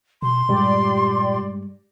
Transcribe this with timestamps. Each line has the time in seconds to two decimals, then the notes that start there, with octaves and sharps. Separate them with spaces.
0.22 B2 C6
0.49 G2 A#2 G3 G#3 G4 D5